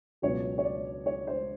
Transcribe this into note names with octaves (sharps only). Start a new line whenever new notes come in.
C#2 B2 F#3 B3 C#5
C#5
D5
C#5
C5